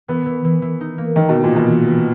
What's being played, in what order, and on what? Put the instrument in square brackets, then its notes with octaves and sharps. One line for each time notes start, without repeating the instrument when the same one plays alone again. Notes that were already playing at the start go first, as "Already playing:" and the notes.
[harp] E3 [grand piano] B3
[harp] E3
E3
E3
D#4
A#3
[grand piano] D#3 [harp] E3
[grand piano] B2 [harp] D#4
[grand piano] A#2
[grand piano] B2 [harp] D#4
[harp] E3
E3